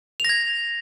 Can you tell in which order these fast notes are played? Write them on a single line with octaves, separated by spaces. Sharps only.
F7 A#6 G#6